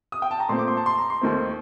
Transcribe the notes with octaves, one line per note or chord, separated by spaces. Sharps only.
D#6
G5
A5
A#5
A#2 A3 C4 C6
D6
C6
A5
C6
A#5
C6
D#2 D#3 A3 C4